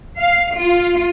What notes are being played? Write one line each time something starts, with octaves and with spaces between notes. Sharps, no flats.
F5
F4